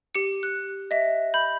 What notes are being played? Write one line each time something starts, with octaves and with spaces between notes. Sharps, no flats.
G4 C#7
F#6
D#5 E5
B5 G6